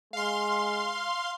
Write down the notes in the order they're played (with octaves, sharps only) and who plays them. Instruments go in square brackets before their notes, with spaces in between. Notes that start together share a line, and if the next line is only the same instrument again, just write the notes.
[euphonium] G#3 [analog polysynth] F5 C6